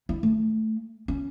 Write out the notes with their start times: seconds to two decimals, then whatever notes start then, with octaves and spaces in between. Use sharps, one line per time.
0.09 E4
0.23 A3
1.08 C#4